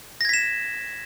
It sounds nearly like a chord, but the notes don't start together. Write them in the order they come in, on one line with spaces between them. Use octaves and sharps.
A#6 G#6 B6 E7